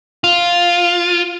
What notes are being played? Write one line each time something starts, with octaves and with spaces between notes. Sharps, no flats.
F4